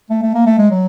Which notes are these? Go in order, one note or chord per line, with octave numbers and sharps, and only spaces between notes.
A3
A3
A#3
A3
G#3
F#3